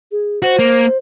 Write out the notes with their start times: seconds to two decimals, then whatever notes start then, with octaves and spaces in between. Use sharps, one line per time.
0.12 G#4
0.42 F#4 C5
0.59 A#3